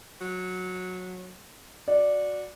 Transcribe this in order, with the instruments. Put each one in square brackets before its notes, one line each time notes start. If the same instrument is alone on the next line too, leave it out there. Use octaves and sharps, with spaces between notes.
[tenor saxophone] F#3
[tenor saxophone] F#4 [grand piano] D5